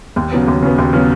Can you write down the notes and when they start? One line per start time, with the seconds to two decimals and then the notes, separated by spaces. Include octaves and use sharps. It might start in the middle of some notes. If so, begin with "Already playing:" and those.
0.16 D#2
0.32 C#3 F#3 B3
0.47 D#2
0.63 C#3 F#3 B3
0.78 D#2
0.93 C#3 F#3 B3